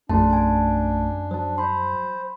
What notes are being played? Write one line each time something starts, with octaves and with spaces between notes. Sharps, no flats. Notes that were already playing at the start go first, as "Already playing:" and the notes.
A#1 F#2 A3 D4 A5 C6
G#5 A5
F#3 C5 A5
C5 B5 C6